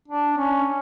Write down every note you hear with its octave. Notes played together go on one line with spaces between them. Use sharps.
D4
C#4